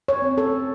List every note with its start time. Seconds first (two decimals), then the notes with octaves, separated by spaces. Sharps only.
0.08 C#5
0.22 C4
0.38 A4